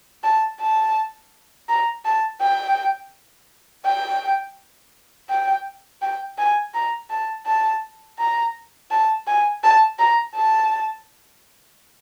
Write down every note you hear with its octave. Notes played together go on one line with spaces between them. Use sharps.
A5
A5
A#5
A5
G5
G5
G5
G5
G#5
A#5
A5
A5
A#5
A5
G#5
A5
A#5
A5